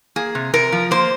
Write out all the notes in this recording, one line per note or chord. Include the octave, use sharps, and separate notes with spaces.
A#3 G#4
C3
C3 A#4
F3
A#3 C5